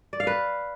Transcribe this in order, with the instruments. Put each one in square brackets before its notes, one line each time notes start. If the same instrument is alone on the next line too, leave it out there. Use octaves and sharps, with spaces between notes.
[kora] D5
F5
B4